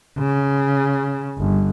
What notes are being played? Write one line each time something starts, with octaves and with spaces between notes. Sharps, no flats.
C#3
G1